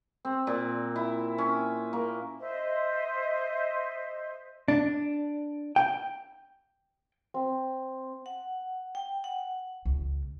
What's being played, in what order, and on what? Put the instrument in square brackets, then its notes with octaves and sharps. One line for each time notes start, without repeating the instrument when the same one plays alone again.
[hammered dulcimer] C4
A#2
E4
C#4
A#3
[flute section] C5 D#5 E5
[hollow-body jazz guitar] D4
G5
[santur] C4
[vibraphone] F#5
G5
F#5
[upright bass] C#2